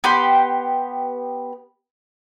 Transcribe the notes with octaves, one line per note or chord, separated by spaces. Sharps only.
B3 G4 G5 C6